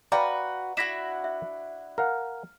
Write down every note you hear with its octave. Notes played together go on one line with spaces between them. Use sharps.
F#4 B4 D5 F5 G5 A#5
D4 E4 F#4 A#6 B6 E7
E5
A#4 F5 F#5 F6